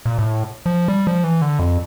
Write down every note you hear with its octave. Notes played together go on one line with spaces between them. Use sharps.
A#2
A2
F3
G3
F3
E3
D3
F2